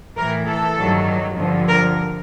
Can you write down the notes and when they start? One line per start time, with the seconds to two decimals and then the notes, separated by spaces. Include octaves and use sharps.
0.17 A2 E3 A#4
0.47 A4
0.77 G2 D#3 F#3
1.37 G2 D3 F3
1.68 A#4